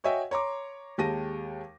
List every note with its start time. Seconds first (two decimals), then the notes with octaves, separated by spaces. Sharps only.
0.04 F#4 C#5 D#5 E5 G5 G#5
0.31 C#5 A#5 C6 D6
0.98 D#2 G#3 G4 A5 A#6 D#7